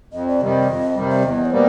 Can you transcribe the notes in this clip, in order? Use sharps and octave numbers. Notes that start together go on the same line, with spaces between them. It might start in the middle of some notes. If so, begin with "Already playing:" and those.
F2 D#5
D5
C3 D#3 G3 D#5
F2
C3 D#3 G3
E5
E2 D#5
C#5
B2 G3 A#3 C5